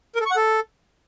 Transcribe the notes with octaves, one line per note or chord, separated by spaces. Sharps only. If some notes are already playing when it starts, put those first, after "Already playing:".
A#4
A4
C#6
F#5
A4